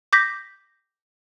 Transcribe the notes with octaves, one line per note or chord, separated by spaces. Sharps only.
D6 G6 A#6 B6